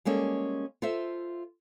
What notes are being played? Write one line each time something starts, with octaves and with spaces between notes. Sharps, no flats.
G3 G#3 A#3 C#4 A4
F4 A4 C5 E5